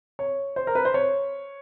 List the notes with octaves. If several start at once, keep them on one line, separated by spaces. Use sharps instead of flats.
C#5
C5
A#4
B4
C5
C#5